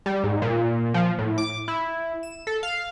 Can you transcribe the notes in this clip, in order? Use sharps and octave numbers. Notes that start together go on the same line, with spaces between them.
G3
G#2
A#2
F3
A2
D6
E4
E7
A4
F5